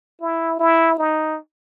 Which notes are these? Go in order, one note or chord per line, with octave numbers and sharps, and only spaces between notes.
E4
E4
D#4